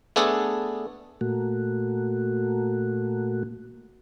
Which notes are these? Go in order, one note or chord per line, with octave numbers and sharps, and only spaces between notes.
A3 B3 D4 G#4 A4
A#2 A3 A#3 F#4